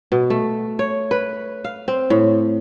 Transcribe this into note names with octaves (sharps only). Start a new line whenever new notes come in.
B2
A3
C#5
B4
F5
C4
A2